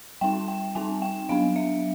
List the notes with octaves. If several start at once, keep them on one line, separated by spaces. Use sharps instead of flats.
G3 C4 D#4 G5
G5
G3 C4 D#4 G#5
G5
F#3 B3 D4 F5
E5